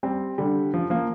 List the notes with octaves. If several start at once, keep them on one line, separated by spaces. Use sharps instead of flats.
G3 C4
D3 G3
F3
F3 A#3